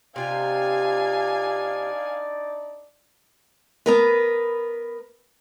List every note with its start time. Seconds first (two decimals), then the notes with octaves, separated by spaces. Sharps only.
0.16 C3 D4 D#4 F4 G4 D5 F5 G#5
3.86 B3 A#4 B4